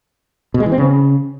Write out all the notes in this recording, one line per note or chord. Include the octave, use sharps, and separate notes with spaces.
B2
G#3
E3
C4
C#3